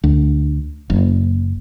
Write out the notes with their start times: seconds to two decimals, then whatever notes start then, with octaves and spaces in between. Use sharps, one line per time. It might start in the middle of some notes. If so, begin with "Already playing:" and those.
0.04 D2
0.90 F#1